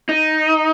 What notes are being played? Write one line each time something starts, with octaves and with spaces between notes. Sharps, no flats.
D#4